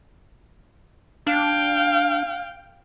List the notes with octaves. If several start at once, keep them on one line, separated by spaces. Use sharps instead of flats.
D4 F5 G5